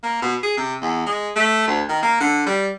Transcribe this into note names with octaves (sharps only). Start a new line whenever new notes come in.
A#3
B2
G#4
C3
E2
G#3
A3
D2
D#3
A#3
D3
G3